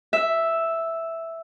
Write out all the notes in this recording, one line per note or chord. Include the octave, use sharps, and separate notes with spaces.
E5